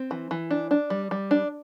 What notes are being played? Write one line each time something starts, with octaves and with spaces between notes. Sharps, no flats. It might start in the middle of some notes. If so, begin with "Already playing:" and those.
Already playing: C4
E3
E3
D4
D4
G3
G3
D4